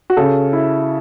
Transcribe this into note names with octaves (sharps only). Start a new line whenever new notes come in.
F#4
C#3 A4
E4